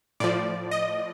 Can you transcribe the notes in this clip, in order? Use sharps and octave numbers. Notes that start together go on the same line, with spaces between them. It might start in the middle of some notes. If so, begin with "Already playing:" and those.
A2 F3 D5
D#5